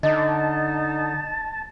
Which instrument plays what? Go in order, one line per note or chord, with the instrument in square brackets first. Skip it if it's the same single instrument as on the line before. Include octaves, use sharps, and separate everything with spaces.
[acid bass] D3 [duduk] D#4 [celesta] D#5 [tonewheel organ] A5